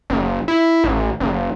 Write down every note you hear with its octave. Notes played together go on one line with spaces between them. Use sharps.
F#1
E4
A1
F#1